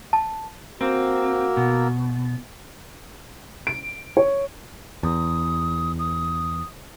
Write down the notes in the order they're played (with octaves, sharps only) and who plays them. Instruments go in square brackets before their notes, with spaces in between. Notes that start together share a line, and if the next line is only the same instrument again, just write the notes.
[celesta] A5
[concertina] A#3 A#4 E6 [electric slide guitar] C4 [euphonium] F#4
[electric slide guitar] B2
[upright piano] D7
C#5
[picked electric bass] E2 [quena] D#6
[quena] D#6